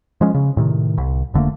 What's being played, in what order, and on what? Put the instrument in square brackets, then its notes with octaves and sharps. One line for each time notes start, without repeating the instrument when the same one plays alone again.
[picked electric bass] F3 G#3 C#4
C#3
A2 C3 D#3
C2
F1 D3 A3 A#3